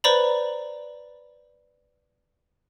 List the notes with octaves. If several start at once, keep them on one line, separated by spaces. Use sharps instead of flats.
B4 C5 D5 A#5 B5